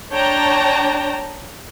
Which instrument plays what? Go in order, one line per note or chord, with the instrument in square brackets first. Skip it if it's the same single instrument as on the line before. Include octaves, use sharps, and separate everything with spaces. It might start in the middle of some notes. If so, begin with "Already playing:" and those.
[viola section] D4 C#5 G5 A5 A#5